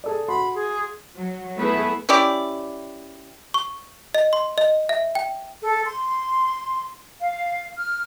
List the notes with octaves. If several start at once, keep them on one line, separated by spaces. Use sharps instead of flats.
G#4 A4 D5
F#4 B5 C6
G#4
F#3
A3 B3 E4 G#4 B4
C#4 E4 G4 D5
C#6
D#5
C6
D#5
E5
G5
A4
C6
F5
F6